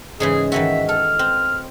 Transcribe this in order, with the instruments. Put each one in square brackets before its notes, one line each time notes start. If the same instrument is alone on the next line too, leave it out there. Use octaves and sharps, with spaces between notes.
[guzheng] G#2 C#3 E3 [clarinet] G#4
[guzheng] D#3 E3 F#4 [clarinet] E5
[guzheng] A4 [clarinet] F6
[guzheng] C4